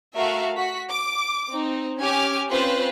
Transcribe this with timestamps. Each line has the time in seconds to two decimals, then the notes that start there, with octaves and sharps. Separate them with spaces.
0.17 A3 F#4 A#4 E5 F5
0.57 F#4 B6
0.91 D6
1.52 C4 D#4
2.00 C#4 G4 G#5 D6 F6
2.50 C4 C#4 F4 B4 C5 F5